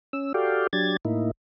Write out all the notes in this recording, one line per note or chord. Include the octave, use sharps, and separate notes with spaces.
C#4 E6
F#4 G4 A4 D5 F5 G5
F#3 D4 G4 G#6 A6
A2 A#3 D#4 E4